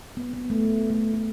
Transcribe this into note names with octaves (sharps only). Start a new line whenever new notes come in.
B3
B3
A3
B3
A3
A3